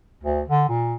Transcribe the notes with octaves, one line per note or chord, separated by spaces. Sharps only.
D2
D3
A#2